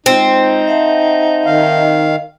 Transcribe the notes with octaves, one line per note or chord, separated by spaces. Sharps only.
G#3 C4 D#4 F4
E5 F#5 A5
D#3 F5